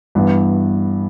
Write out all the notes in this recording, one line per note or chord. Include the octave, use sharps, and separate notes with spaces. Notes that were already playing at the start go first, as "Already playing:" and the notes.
G2 E3 B3 E4